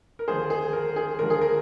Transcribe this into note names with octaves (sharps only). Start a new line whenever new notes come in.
A#4
D#2 D3 F3 G#4 C5
G#4
A#4
G#4
D#2 D3 F3 A#4
G#4
A#4